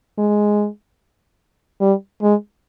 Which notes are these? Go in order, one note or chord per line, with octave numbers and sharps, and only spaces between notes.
G#3
G3
G#3